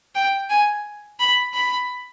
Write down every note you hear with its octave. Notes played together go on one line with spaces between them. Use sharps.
G5
G#5
B5
B5